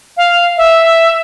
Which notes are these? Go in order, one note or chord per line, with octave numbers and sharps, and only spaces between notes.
F5
E5